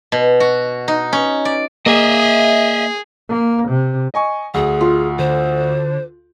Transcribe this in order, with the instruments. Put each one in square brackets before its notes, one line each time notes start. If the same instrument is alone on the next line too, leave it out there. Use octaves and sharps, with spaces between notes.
[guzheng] B2
F#4
D#4
C#4
D5
[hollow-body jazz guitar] A#3 [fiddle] G#4 [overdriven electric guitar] D#5 E5
[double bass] A#3
C3
[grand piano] D#5 G#5 C#6
[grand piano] D2 [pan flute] G#4
[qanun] F4
[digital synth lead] D3 [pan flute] C5